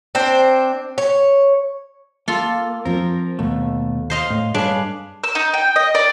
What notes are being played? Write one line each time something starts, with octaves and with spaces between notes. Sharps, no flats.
C4 D4 C5
C#5
A#3 F4 A4
F3 C4 A#4
D#2 B2 A3
C5 D#5 F5
A2
G2 D4 G#4 B4 C#5 F5 G#5
E6
D#4
G5
D#5
D5